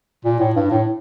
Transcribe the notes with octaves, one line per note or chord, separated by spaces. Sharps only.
A#2
A2
G2
A2